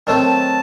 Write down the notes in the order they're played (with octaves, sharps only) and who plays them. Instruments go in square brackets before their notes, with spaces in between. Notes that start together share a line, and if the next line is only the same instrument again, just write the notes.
[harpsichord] D#3 F#3 A3 C4 [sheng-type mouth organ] A5